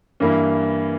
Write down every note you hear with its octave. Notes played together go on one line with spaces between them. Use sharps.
G2 E3 A#3 E4